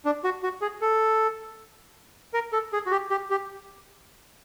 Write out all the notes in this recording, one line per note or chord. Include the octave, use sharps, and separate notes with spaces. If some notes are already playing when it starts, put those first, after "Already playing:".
D4
F#4
F#4
G#4
A4
A#4
A4
G#4
F#4
G4
G4
G4